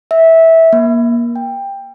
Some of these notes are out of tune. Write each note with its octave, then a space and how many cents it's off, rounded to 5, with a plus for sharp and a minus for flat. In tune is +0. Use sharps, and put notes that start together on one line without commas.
E5 -15
A#3 +25
G5 +15